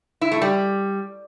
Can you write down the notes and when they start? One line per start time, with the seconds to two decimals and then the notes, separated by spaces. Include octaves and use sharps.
0.21 E4
0.31 A3
0.42 G3